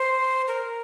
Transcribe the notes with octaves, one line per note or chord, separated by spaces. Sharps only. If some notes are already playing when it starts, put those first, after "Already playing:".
Already playing: C5
A#4